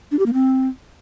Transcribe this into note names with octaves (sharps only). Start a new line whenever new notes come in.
D4
G4
A#3
C4